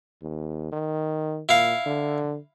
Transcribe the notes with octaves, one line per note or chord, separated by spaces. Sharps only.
D#2
D#3
A#2 E4 F5
D3